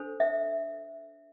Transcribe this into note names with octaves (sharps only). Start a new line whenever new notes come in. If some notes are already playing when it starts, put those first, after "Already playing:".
Already playing: D4 A4 C5
E5